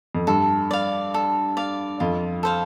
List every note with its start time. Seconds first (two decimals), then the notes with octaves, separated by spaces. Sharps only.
0.15 F2
0.27 G2 A4
0.71 D5 F5
1.14 A4
1.57 D5 F5
2.00 F2 F4
2.43 A4 C5 F5